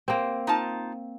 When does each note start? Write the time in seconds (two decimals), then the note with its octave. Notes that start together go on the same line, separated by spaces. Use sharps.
0.08 A#3 C4
0.47 D#4 F4 A5